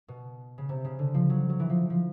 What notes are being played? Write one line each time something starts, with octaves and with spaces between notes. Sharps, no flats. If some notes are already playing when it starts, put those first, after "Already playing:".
B2
C#3
C3
C#3
D3
F3
F#3
F#3
E3
F3
F3